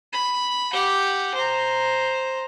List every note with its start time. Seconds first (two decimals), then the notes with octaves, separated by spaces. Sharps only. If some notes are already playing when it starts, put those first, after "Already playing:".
0.13 B5
0.73 G4 F#5
1.34 C5 A#5